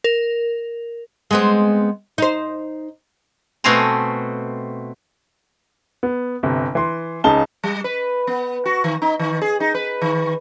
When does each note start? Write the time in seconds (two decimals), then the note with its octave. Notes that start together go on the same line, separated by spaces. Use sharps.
0.04 A#4
1.31 G#3 B3 C4
2.18 D#4 C5
3.64 B2 A3 C4 G#5 A#5 C6
6.03 B3
6.43 G1 C3
6.75 E3 C6
7.24 C#2 C#3 D#4 A5 G7
7.64 G3
7.84 B4
8.27 B3
8.66 F#4
8.84 D#3
9.02 D#4
9.19 D#3
9.42 G#4
9.60 D#4
9.74 B4
10.02 D#3